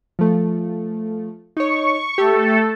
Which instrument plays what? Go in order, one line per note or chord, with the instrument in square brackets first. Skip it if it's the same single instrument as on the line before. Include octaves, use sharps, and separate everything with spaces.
[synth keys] F3 A3
[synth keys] D#4 C#5 [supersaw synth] C#6
[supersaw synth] A3 A4 [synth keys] G4